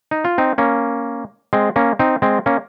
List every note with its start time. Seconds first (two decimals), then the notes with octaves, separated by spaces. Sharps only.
0.11 D#4
0.25 F4
0.38 C4 D#4
0.58 A#3 C#4
1.53 G#3 C4
1.76 A#3 C#4
1.99 C4 D#4
2.22 G#3 C4
2.46 A#3 C#4